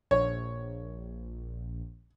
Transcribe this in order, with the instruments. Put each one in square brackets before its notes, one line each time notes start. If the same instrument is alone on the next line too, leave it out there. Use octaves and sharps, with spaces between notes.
[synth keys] A#1 [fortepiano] C#5